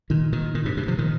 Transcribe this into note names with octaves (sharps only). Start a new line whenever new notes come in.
A#2 D#3
A#2 D#3
A#2 D#3
G2 C3
G2 C3
C3 F3
A#2 D#3